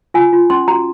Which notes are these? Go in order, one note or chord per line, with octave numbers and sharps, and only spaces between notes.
F4 G#5
F4
C#4 C6
F#4 A#5